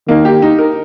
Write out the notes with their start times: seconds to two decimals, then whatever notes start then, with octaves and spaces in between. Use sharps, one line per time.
0.08 D#3 A#3
0.25 G4
0.42 D#4
0.59 A#4